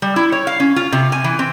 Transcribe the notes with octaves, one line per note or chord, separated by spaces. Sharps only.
G3
E4
C#5
F5
C#4
F4
C3
G#5
E3
C4